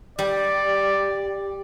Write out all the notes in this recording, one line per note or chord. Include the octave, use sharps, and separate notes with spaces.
G3 D5